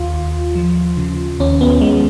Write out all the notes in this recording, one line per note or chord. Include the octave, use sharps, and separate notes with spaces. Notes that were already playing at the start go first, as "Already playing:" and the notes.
Already playing: D#2 F4
D#2
F3
C#3
D#2 C#4
B3
D#2 G#3